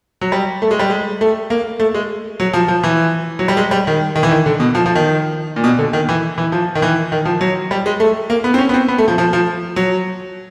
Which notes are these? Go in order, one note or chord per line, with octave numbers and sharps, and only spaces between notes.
F#3
G3
A3
G#3
G3
G#3
A3
A#3
A3
G#3
F#3
F3
F3
E3
F#3
G3
G#3
G3
D#3
D#3
E3
D#3
D3
B2
F3
F3
D#3
A#2
B2
D3
D#3
E3
E3
F3
D#3
E3
D#3
F3
F#3
G3
G#3
A3
A#3
B3
C4
C#4
B3
C4
B3
A3
F3
F3
F3
F#3